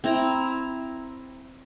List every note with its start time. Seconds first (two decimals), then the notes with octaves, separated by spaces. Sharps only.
0.04 C4 E4 A#5